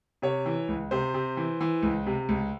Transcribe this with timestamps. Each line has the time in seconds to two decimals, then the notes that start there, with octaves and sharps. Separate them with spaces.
0.22 C3 C#5
0.46 E3
0.68 C#2
0.91 C3 C5
1.14 C3
1.37 E3
1.61 E3
1.83 C#2
2.06 C3
2.29 C#2